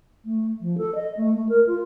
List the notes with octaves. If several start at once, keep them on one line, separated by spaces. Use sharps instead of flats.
A3
F3
A4
D#5
A3
A3
A#4
F4